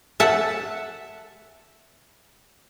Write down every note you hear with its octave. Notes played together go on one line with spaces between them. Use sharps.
E5 F#5 A5